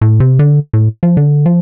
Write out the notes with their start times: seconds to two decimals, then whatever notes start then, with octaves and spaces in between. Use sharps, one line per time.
0.01 A2
0.20 C3
0.39 D3
0.73 A2
1.03 F3
1.17 D3
1.46 F3